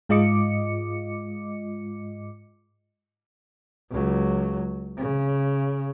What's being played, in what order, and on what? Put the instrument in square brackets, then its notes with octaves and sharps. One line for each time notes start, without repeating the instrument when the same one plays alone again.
[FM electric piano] G#2 G#3 F4 D#5 D6 C#7
[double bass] C#2 F#3
C#3